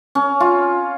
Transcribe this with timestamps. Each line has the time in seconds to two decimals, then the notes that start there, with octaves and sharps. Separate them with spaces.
0.15 C#4
0.40 F4